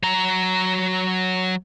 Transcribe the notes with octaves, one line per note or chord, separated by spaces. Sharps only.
F#3 A#5